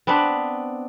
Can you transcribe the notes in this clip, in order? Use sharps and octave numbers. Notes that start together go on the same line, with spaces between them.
B3 C4 D4 B4